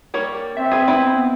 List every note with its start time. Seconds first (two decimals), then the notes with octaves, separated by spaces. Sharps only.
0.14 G3 A#3 C#5
0.57 C4 E5
0.72 G#4 B4
0.88 B3 E4 B4